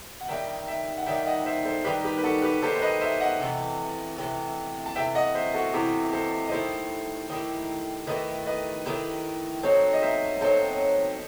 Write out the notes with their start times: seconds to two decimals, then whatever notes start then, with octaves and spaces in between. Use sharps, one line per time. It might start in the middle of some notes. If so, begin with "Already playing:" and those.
0.21 F#5
0.29 D#3 G3 D#4 E5 G5
0.67 E5 G5
0.97 F#5
1.06 D#3 G3 D#4 E5 G5
1.26 D#5 F#5
1.45 C5 E5
1.65 A4 C5
1.84 D#3 G3 D#4 G4 B4
2.03 G4 B4
2.18 B4
2.23 F#4 A4
2.42 G4 B4
2.62 D#3 G3 D#4 A4 C5
2.76 C5
2.82 B4 D#5
3.01 C5 E5
3.20 D#5 F#5
3.40 C3 E3 A3
4.18 C3 E3 A3
4.86 A5
4.96 C3 E3 A3 E5 G5
5.15 D#5 F#5
5.35 C5 E5
5.54 F#4 A4
5.74 C3 E3 A3 E4 G4
6.13 A4 C5
6.47 D#5
6.51 D#3 A3 E4 G4 A4 C5
7.30 D#3 A3 E4 G4
8.07 D#3 A3 E4 G4 B4 D#5
8.46 B4 D#5
8.86 D#3 A3 E4 G4
9.63 F#3 C4 D#4 F#4 A4 C5
9.93 D#5
10.02 C5 E5
10.41 F#3 C4 D#4 F#4 A4 C5